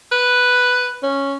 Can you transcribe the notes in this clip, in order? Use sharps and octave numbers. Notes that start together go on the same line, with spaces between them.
B4
C#4